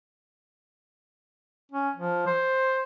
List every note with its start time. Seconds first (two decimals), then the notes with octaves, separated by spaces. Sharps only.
1.72 C#4
1.96 F3
2.27 C5